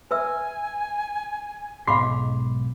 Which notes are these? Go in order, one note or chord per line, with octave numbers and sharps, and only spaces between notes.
B4 E5 G#5 E6
B1 G#2 F5 B5 C6 D6